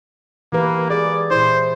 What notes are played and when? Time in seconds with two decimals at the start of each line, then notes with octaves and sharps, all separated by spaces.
0.52 E3 A#3 G4 B4
0.90 G#4 D5
1.31 A#2 E4 C5